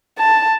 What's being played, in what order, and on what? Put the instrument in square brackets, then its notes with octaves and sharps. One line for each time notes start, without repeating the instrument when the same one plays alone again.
[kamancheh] A5